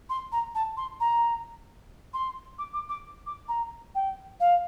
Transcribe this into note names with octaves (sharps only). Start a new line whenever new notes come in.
C6
A#5
A5
C6
A#5
C6
D6
D6
D6
D6
A#5
G5
F5